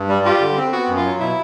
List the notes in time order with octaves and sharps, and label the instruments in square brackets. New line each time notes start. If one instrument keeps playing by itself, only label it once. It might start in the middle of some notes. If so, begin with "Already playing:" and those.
Already playing: [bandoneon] G2
G3
[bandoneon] F4 [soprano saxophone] G4
[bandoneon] D3
C4
[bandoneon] B3 [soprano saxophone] F#4
[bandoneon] F#2
[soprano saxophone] F4
[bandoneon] F#3
[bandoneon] B2 [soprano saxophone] E4